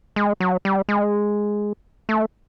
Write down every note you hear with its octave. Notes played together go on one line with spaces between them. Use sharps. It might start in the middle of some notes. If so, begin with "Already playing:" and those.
G#3
F#3
G3
G#3
A3